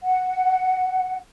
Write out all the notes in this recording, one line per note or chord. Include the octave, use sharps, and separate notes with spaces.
F#5